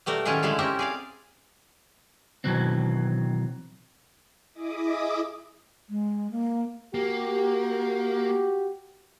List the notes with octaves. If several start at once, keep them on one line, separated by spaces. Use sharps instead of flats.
B2 G3 A3 A#4
A2 D#3 F#3 C#4 F4 G#4
D3 G#3 A3 E4 F5
C4 C#4 G4 A#4 E5
G#4 D5 F5
B2 D#3 E3 F#3 C4
E4 G#4 D#5 E5 D6 D#6
G#3
A#3
A#3 F#4 G4